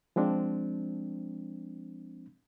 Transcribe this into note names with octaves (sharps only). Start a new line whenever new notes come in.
F3 G#3 C4 D4